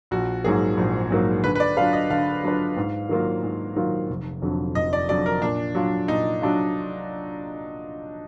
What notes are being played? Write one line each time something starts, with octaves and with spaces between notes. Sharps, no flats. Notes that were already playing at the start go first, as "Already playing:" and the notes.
A#1 F#4
G#2 F#3 A#3 G#4
A#1
G#2 F#3 A#3
D3 B4
B4
D5
F#3 D4 F4 B4 F5
D#5
D3 F5
F#3 D4 F4 B4
G#2
D#3 F#3 A#3 F4
G#2
D#3 F#3 A#3 F4
F1
F2 D3 F#3
F1 D#5
D5
F2 D3 F#3 D5
A#4
A#2 D4
F#3 D4 F4
A#2 D#4
F#3 D4 F4